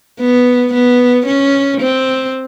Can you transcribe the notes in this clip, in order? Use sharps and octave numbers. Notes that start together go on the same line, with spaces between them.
B3
B3
C#4
C4